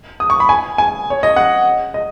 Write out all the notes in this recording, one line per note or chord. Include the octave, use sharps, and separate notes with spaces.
D#6
C#6
B5
G#5
G#5
C#5
D#5
F#5
D#5